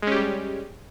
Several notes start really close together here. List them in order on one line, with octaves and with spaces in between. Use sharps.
G#3 C#4 G4 G3